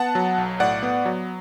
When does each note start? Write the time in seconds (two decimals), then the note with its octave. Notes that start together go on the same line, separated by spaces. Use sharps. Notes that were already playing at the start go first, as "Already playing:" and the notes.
Already playing: B3 F#5 A5
0.15 F#3
0.38 B1
0.60 A2 D5 F#5
0.83 B3
1.05 F#3